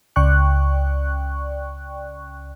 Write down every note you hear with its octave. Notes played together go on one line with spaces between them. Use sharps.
C#2 D5 G5 C#6 F#6